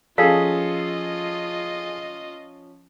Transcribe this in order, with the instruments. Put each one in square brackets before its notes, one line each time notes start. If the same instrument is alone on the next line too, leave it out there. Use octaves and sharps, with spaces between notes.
[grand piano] F3 C#4 [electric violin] F4 D#5 [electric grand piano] G#4 A4 [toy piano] F5